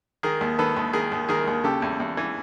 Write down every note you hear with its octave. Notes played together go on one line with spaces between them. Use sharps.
D#3 G#4 A#4
D#2
D#3 A4 B4
D#2
D#3 G#4 A#4
D#2
D#3 G#4 A#4
D#2
C#3 G4 A4
E2
E2
E3